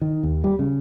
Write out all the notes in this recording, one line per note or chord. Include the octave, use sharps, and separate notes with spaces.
D#3
D#2
G3
C#3